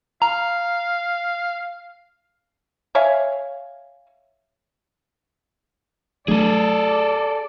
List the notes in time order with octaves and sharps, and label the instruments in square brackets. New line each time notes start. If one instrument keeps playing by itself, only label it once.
[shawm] F5 [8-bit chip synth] A#5
[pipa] C#5 E5 F5 G#5
[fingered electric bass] F#3 A3 D4 [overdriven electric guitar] G#4 A4 [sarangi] D5